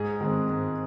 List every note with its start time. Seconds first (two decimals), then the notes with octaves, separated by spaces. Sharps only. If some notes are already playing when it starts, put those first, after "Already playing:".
Already playing: G#2 G#4
0.21 D#3 G#3 C4
0.49 G#2